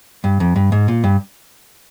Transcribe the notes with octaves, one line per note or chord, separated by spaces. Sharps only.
G2
F2
G2
G#2
A#2
G2